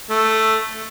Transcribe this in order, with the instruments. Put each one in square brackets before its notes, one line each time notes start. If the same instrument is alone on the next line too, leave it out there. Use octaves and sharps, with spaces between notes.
[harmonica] A3